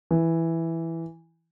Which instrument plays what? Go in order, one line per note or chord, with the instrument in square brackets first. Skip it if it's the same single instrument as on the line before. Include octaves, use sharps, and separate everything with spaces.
[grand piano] E3